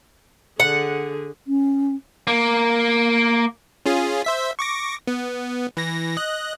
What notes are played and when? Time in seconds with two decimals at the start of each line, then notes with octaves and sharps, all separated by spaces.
0.60 D3 G#4 F#5
1.47 C#4
2.27 A#3
3.86 C#4 F4 G#4
4.25 C5 E5 B6
4.59 C#6 D6 A#6
5.07 B3
5.77 E3 A#6
6.17 D#5 F#6